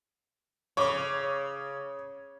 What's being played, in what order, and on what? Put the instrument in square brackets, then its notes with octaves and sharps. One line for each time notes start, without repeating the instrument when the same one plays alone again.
[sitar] C#3 [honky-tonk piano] C#5 D6